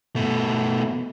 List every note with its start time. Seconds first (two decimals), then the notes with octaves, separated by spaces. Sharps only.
0.16 B2 A3